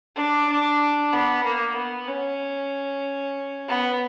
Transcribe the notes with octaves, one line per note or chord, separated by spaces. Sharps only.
D4
D4
B3
A#3
B3
C#4
B3